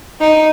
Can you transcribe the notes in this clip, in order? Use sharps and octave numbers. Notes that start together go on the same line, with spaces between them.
D#4